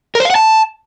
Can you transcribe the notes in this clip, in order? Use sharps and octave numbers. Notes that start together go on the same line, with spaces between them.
A#4
C5
F5
F#5
A5